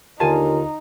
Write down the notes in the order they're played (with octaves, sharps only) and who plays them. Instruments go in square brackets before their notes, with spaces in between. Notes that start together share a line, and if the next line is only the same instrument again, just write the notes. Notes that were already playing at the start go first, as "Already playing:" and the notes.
[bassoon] D#2 [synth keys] D3 F4 [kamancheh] D#4 [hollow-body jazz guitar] G#5 A5